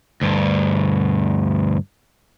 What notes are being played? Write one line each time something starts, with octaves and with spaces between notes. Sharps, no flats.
D2 G2